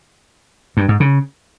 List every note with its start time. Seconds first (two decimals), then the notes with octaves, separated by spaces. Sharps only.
0.77 G2
0.88 G#2
1.00 C#3